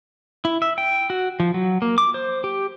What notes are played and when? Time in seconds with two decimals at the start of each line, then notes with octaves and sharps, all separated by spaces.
0.45 E4
0.62 E5
0.78 G5
1.10 F#4
1.40 F3
1.54 F#3
1.82 A#3
1.98 D6
2.14 C5
2.44 G4